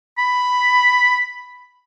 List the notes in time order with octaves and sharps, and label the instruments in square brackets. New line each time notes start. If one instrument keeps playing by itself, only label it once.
[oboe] B5